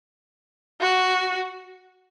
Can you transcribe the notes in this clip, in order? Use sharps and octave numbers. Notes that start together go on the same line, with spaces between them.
F#4